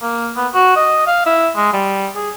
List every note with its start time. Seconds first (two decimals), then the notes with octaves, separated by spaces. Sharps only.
0.02 A#3
0.36 B3
0.54 F#4
0.76 D#5
1.07 F5
1.26 E4
1.56 G#3
1.73 G3
2.16 G#4